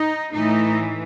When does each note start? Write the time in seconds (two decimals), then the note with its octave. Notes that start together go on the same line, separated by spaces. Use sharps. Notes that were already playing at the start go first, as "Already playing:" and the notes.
Already playing: D#4
0.33 A2 E3 A3 D#4